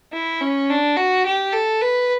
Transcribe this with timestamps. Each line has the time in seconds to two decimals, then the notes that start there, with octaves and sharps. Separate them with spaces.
0.13 E4
0.41 C#4
0.70 D4
0.97 F#4
1.26 G4
1.53 A4
1.81 B4